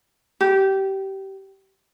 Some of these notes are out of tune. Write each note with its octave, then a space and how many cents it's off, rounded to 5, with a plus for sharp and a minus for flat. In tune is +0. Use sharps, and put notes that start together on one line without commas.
G4 -20